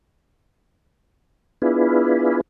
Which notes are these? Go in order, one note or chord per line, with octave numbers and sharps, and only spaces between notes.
B3 D4 E4 F4 G#4 B4